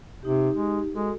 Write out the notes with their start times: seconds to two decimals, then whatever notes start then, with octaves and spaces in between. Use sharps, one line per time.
0.23 C3 D#4 G4
0.55 G#3
0.95 G#3 F#4 A4